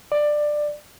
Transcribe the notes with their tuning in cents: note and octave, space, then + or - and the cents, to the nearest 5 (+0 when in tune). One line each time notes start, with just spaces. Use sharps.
D5 +15